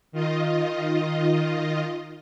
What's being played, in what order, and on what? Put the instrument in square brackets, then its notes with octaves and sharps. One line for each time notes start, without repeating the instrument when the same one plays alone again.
[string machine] D#3 F4 D#5